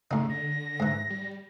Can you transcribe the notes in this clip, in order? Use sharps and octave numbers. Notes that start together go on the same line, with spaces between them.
A2 C#3 D#4
D3 A#6
G#2 E3
G3